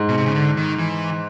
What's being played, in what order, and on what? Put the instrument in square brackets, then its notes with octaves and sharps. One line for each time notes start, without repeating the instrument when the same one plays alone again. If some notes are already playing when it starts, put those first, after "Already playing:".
Already playing: [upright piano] G#2
[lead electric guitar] B2
C3
C#3
D3
D#3
E3